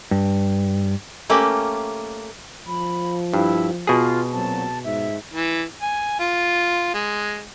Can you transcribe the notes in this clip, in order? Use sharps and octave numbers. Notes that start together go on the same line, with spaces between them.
G2
A3 A#3 C#4 G4
F3 B5
G2 E4
B2 F4 G#4
A#2 F#3 C4 A5
G#2 E5
E3
G#5
F4
G#3